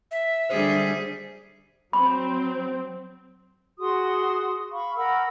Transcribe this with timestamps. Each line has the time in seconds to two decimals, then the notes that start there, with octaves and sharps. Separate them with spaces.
0.11 E5
0.49 D3 G3 G#4 C5
1.93 F#3 C4 B5
3.78 F#4 G#4 C6 D#6
4.72 F5 B5 C#6
4.96 A#4 F#5 B5 E6